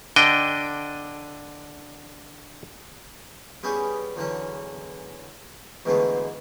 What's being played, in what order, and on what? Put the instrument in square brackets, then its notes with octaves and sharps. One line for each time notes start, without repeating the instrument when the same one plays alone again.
[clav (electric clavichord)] D3 D4 D#5 G5
[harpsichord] G3 B3 C#4 E4 G4 G#4
E2 D3 F#3 C#4
E2 G#2 B2 D3 A3 B3